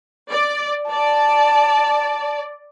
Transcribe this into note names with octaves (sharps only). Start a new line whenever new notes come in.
D5
D5 A5